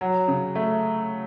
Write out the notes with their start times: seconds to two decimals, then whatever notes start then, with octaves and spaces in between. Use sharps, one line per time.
0.01 F#3
0.28 C#3
0.55 A3